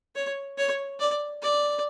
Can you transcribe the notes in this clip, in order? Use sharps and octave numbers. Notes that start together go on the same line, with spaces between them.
C#5
C#5
D5
D5